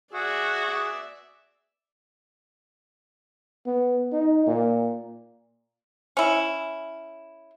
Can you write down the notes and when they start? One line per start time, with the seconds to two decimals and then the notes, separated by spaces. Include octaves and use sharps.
0.14 F#4 G#4 D5 E5
3.66 B3
4.12 D#4
4.47 A#2
6.17 C#4 E4